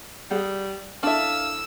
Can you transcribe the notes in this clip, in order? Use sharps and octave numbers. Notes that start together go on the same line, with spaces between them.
G3 G#4 F#5
D4 E4 A4 E5 F5 A5 E6